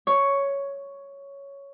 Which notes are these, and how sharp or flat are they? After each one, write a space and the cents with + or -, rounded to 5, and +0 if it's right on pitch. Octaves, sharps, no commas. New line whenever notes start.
C#5 +5